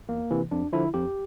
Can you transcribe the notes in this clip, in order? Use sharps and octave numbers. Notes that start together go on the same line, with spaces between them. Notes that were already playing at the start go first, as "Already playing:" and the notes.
E2 A#3
C3 E3
F2 D4
D3 F3 E4
F2 G4